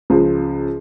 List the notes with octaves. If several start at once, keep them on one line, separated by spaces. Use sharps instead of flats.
C#2 C#3 F3